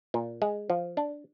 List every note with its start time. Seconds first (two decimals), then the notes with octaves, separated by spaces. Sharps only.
0.14 A#2
0.42 G#3
0.70 F3
0.97 D4